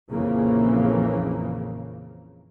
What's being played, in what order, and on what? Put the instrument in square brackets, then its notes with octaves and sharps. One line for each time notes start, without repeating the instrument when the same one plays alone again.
[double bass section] A#1 F2 C#3 E3 F3 A#3